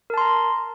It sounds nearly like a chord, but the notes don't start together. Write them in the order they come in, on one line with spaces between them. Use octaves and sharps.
A#4 A5 C6 A#5